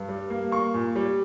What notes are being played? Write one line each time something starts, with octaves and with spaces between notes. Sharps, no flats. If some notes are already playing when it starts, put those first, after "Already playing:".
Already playing: G2
G3
A#3
A#3 C#6
A#2
G3